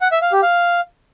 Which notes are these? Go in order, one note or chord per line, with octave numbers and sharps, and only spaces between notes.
F#5
E5
F5
G4
F5